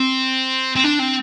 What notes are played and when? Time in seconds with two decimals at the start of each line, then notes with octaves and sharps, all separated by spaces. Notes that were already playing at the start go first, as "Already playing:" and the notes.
Already playing: C4
0.76 C4
0.84 D4
1.00 C4